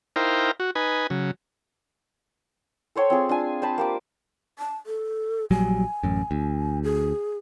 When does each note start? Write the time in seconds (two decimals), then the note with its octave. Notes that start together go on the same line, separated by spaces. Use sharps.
0.16 D#4 E4 A#4 C5 F5 G5
0.60 F#4
0.75 D#4 B4 G#5
1.10 C#3 F#3
2.95 A4 C5 C#5 G5
3.10 C4 F4 G#4
3.29 D4 F4 G#5
3.62 C5 G5 A5 B5
3.78 A#3 G4 D6
4.59 A5
4.86 A4
5.51 A#1 F#3 G3 G#5
6.03 A1 F#2
6.31 D2
6.84 G#4